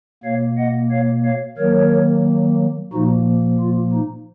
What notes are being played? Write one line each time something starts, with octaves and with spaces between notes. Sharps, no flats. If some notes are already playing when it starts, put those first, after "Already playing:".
B2 A#3 C#5 F5
D#5 F#5
C#5 F5
C#5 F5
D#3 F#3 A#3 A#4 C#5
A#2 F3 A#3 D#4 F#4
F4
D#4